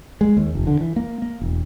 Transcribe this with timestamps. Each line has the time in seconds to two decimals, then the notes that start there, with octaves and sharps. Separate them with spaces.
0.21 G#3
0.37 D#2
0.55 F1
0.67 D3
0.81 E3
0.96 A#3
1.22 A#3
1.41 E1